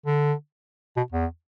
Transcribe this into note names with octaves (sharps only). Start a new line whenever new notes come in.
D3
B2
E2